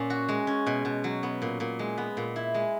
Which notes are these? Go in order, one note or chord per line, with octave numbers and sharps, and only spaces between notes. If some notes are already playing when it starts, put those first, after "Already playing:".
Already playing: A#2 C#4
F#4
G#3
C#4
B2
B2
F#3
B3
A#2
A#2
G#3
B3
A#2
E4
G#3